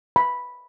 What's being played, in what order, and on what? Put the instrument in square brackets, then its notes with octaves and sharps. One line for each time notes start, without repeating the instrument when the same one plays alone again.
[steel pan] B5